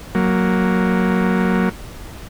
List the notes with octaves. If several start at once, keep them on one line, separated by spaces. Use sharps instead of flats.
F#3 A#3